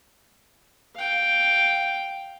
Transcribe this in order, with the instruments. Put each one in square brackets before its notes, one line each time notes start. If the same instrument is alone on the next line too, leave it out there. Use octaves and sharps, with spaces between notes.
[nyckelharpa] F5 G5